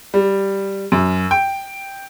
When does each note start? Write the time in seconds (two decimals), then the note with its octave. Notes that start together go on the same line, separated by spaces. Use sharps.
0.14 G3
0.92 F#2
1.31 G5